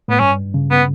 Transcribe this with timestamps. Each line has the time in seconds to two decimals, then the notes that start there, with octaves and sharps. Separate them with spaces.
0.08 A2 B3
0.20 G2 C#4
0.54 C#3
0.71 B3